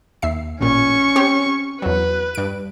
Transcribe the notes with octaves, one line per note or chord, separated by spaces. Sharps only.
D#2 E5 C7
A1 A#2 C#4 C#6
C4 G4 C#5
E2 F#3 B4
G2 D7